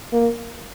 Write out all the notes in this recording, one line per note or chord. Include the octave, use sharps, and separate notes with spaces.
A#3